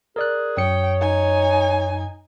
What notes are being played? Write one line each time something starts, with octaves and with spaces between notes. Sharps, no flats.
G#4 A#4 D5 F#6
F#2 C#5 G5 D#6 C#7
D#4 G#5